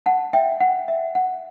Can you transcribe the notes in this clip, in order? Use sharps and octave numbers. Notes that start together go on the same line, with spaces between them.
F#5 A5
E5 G5
F#5
E5
F#5